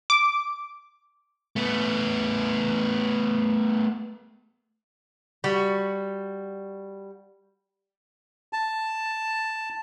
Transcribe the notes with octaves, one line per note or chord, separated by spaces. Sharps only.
D6
A3 B3
G3 F#4
A5